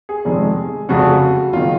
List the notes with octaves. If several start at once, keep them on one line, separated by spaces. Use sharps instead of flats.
G#4
F1 F2 D#3 G#3
F1 F2 C#3 F#4
F#1 D#3 F4